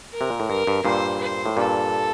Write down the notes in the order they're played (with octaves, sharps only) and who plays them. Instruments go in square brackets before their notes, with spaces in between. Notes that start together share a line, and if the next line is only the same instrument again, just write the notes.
[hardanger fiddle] A#4
[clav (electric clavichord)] C3
A#2
A2
[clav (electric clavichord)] G2 [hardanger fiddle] A#4
[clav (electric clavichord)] G2
[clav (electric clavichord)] G2 A#2 [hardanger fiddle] C5
[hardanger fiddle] C5
[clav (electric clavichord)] A2
[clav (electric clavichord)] G2 A#2 [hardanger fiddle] A4